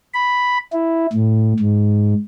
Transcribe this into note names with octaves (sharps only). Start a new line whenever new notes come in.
B5
E4
A2
G#2